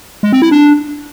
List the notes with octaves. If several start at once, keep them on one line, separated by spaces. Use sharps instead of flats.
G#3
C4
E4
D4